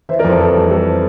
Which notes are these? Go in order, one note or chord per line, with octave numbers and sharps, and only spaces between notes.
E3 C5 E5
A#4 D5
F2
A4 C5
E3 A4
G3
G3 A4 C5